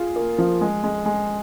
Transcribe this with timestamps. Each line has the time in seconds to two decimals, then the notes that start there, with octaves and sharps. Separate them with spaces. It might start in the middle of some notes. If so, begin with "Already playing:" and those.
Already playing: F4 G#4
0.16 A#3
0.38 F3
0.61 G#3
0.84 G#3
1.06 G#3